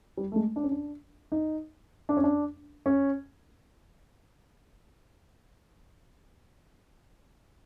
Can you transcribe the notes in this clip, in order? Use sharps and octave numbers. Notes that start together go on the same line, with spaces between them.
G3
A3
G#3
D4
C#4
D4
D#4
D4
C#4
D4
C#4